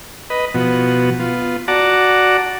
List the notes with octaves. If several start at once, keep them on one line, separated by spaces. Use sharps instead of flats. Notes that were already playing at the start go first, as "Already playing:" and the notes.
B4 D#5
B2 F3 B3 F#4
B3 F4
F#4 D5 F#5 A5 A#5 D6